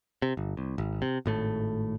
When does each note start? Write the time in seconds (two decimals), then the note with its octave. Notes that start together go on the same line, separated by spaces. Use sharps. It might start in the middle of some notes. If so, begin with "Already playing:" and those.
0.22 C3
0.37 G1
0.57 C2
0.78 G#1
1.02 C3
1.26 G#1 A2 A3